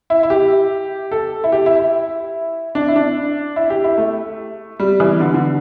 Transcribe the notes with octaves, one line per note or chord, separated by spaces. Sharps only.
E4
E4
G4
A4
E4
G4
E4
E4
D4
E4
D4
E4
G4
E4
A3
G3
E3
D3
D3